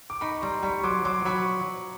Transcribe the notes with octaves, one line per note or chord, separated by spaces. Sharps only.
D6
D#4 B5 C#6
G3 A#5 C6
G3 B5 C#6
F#3 C6 D6
F#3 C6 D6
F#3 B5 C#6